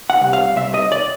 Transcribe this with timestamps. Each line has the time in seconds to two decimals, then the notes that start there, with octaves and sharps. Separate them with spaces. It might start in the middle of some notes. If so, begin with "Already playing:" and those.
0.10 F#5
0.21 C2
0.33 F5
0.56 C2 E5
0.74 D#5
0.92 D5